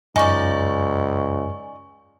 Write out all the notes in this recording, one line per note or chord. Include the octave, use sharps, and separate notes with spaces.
C#2 F#2 D#4 D5 G#5 C#6